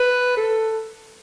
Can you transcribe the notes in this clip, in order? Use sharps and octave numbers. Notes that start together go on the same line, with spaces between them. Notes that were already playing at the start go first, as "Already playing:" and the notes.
Already playing: B4
A4